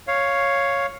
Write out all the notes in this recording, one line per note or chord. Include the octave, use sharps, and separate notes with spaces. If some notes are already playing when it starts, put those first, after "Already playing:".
C#5 F5